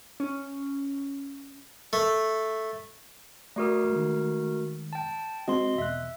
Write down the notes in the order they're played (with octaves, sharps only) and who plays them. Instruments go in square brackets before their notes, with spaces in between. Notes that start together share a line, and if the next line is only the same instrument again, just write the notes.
[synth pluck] C#4
[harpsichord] A3
[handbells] A3 F#4 A#4 [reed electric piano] D5 D6 D#6
[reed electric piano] D#3 G#3
[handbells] G5 A5
[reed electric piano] G#3 C4 F#4 [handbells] D#5 C6
[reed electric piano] E2 B2 F#6 [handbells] E5